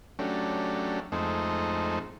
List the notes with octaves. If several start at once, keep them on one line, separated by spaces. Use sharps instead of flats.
F#3 A3 C#4 D4 G4
F2 G#3 A3 C4 D#4